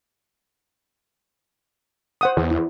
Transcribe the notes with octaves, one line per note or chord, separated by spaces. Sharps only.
C5 F#5 D#6
E2
E4